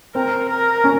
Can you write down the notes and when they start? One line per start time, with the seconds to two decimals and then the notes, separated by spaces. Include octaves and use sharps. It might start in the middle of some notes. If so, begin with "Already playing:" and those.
0.15 C4 A#4
0.49 A#4
0.84 C#4